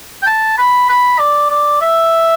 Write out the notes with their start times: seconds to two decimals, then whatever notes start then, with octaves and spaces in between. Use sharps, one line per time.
0.22 G5
0.27 A5
0.58 B5
0.89 B5
1.19 D5
1.50 D5
1.81 E5